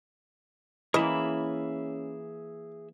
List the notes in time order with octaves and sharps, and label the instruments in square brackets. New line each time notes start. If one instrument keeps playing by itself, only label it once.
[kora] E3 A#3 [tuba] C#4 [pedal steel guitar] G#4 E5 B5 [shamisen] D#5